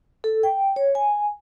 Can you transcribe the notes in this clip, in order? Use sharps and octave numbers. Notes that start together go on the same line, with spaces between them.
A4
G5
C#5
G#5